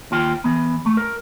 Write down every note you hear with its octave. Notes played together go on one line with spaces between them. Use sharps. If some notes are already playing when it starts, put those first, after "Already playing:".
D#2 F4 G5
E3 B3
A3
A#4